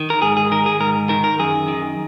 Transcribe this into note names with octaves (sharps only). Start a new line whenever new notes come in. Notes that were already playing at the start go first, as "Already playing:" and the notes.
Already playing: D#3
A#4
G#2 G#4
G#4
D#3 A#4
G#4
G#2 A#4
D#3 A#4
A#4
F#2 G#4
D#3